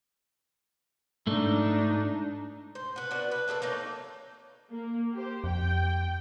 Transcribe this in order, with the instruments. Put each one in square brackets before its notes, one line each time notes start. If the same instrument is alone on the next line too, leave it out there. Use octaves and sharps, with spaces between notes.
[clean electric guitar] G#2 A3 [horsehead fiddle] D4 D#4
[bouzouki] C5
F#4 B4
B3 D4 F#4
B4
A3 A#3 G#4 A4
A3 A#3 C#4 D#4
[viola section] A#3
G4 C5
[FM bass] F2 [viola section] G5